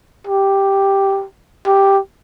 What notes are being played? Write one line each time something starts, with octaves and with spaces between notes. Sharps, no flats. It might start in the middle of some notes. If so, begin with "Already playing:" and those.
G4
G4